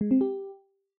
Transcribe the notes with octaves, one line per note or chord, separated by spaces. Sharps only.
G#3
C4
G4